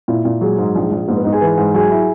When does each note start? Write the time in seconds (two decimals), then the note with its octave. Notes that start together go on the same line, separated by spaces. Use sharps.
0.08 A#2 E4
0.25 A#2
0.41 F#3 G#3 G#4
0.58 G#2
0.75 A#1
0.91 A#1
1.08 G#2 A#3 A#4
1.16 B3 B4
1.24 G#2 D#4 D#5
1.32 G#4 G#5
1.41 E3
1.57 G#2
1.74 F#3 G#4 G#5
1.91 E4